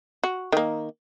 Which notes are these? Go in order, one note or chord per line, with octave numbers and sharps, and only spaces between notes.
F#4
D#3 A#3